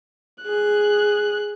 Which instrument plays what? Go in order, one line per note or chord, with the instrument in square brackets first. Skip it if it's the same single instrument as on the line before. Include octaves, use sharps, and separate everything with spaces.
[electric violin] G#4 F#6